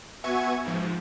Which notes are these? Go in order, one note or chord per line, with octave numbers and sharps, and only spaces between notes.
B3 F#4 E5 G#5 C#6 G#6
G#2 F3